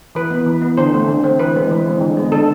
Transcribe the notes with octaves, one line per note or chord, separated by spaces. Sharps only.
E3 B4
B3
E3
B3
D3 C5
A3 C4
D3
A3 C4
E3 B4
G#3 C4
E3
G#3 C4
D3
G#3 B3
D3 A4